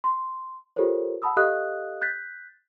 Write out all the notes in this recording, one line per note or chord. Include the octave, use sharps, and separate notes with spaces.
C6
F4 G4 A4 A#4 C5 C#5
F#5 A5 B5 D#6 E6
G4 A4 D#5 F5 D#6 F#6
F#6 G6 A6 B6